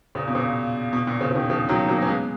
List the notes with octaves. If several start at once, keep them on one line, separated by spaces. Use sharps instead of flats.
A#2 C#3
B2
A#2 C#3
B2
A#2
A#2 C#3
C#3
B2 D#3
C#3 F3
D#3 F#3
F#3 A#3
C#4
G#3 B3